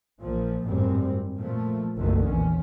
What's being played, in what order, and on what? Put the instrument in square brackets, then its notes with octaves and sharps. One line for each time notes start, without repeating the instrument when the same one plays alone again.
[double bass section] A#1 A#2 F3
G#1 F#2 A2 G3 C4
A#2 F3 A3
F#1 B1 D3 D#3 A3
A#1 E2 C#4